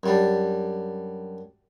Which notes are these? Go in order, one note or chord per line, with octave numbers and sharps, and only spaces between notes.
F#2 G3 D4